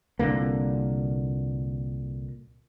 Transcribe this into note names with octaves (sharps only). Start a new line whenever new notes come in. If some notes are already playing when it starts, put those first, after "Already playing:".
C2 A#2 D3 A#3